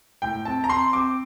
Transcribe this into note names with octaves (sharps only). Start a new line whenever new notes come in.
A2 G5
C4 A5
A#5
C4 C6
C4 D6